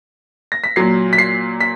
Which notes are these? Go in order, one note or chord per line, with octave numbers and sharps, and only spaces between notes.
A#6
B6
A#2 F#3 C7
B6
C7
B6